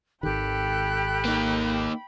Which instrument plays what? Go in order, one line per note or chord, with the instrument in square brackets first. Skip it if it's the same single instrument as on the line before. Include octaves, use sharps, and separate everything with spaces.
[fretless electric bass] G#1 D#3 [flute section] G4 A4 F#6 [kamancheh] G5 B5
[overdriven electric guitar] A#3 D#4